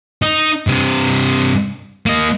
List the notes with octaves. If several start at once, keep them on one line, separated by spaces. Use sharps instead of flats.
D#4
G2 C3
A#3 D#5